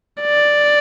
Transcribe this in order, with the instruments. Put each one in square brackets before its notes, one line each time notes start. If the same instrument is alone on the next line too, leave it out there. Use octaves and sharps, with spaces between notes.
[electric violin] D5